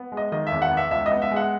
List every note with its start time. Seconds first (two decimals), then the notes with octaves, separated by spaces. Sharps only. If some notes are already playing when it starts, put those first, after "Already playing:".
Already playing: B3
0.12 G#3
0.17 D#5
0.32 D#3 D#5
0.47 E5
0.52 E2
0.62 F#5
0.71 B3
0.77 E5
0.91 C#2 E5
1.06 D#5
1.11 B3
1.22 E5
1.32 G#3 F#5